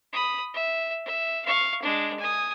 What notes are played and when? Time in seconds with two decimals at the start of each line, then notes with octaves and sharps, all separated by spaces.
0.13 B5 D#6
0.54 E5
1.05 E5
1.45 F5 C#6
1.82 G#3 D4
2.19 G#5 D#6